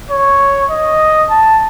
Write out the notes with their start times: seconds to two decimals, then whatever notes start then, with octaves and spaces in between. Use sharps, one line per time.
0.11 C#5
0.71 D#5
1.30 A5